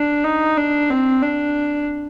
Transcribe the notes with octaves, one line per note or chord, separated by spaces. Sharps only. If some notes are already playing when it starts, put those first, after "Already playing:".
Already playing: D4
D#4
D4
C4
D4